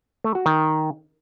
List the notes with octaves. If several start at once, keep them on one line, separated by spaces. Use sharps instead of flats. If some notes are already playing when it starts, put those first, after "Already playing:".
A3
F#4
D#3